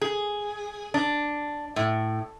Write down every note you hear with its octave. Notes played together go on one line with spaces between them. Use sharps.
G#4
D4
A2